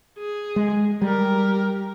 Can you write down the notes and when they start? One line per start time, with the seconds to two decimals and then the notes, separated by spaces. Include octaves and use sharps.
0.18 G#4
0.56 G#3
1.02 G3 G4 A#4